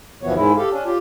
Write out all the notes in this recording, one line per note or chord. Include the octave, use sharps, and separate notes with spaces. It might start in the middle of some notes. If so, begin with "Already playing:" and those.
D#2 B2 E3 F3 B3 C#5
G#2 D#3 G#3 E4
G4 A4 F5
C#4 D4
F4 G4